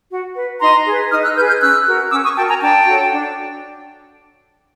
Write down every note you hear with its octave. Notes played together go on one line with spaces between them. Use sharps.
F#4
B4
D#4 A#5 C6
G#4 B4
D#4 D#6 F6
E6 F#6
G#4 B4 F6 G6
F6 G6
C#4 E6 F#6
F#4 A#4
C#4 D6 E6
C#6 D#6
F#4 A#4 G5 A5
G#5 A#5
D4 G5 A5
F#4 A4 C#5
D4